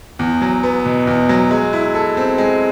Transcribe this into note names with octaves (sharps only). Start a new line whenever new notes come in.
E2
F#3
B3
B2
E2
F#3
G#3
E4
A4
C4
G#3